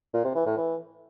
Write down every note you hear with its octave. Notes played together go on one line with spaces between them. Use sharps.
A#2
C3
E3
A2
E3